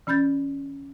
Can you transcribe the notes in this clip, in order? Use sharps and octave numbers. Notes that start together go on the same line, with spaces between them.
E3 C#4 B5 G6 A6